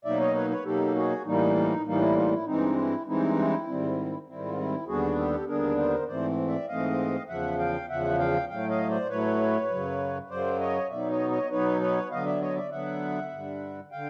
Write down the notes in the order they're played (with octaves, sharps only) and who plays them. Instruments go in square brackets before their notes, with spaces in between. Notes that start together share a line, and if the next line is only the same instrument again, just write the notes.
[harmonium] B2 F#3 A#3 D#4 D5 E5
C#5 D#5
B4 C#5
B4 C#5
B2 F#3 A#3 D#4 G4 A4
F#4 G#4
A2 E3 G3 A#3 D#4
D#4
A2 E3 G3 A#3 D#4
E4
D#4 F4
E4
G2 E3 G#3 C4 D#4
E4
G2 E3 G#3 C4 D#4 E4
E4
G#2 D#3 G3 C4
G#2 D#3 G3 C4 E4
F4
E4
D#2 D3 G3 B3 D4 F#4 G#4
G4 A4
D#2 D3 G3 B3 D4 G#4 A#4
A#4 C5
G#2 E3 A3 C4 C5 D5
D5 E5
G#2 E3 A3 C4 D#5 F5
E2 C#3 F3 E5 F#5
F5 G5
E2 C#3 F3 E5 F#5
F5 G5
A2 F#3 A3 F5 G5
D#5 F5
C5 D5
A2 F#3 A3 B4 C#5
F#2 C#3 F#3
F#2 C#3 F#3 C5 D5
C#5 D#5
B2 F#3 B3 D#4 D5 E5
C#5 D#5
C#5 D#5
B2 F#3 B3 D#4 B4 C#5
B4 C#5
D3 F#3 B3 D#5 F5
D5 E5
C#5 D#5
D5 E5
D3 F#3 B3 E5 F#5
G2 D3 G3
D3 F5 G5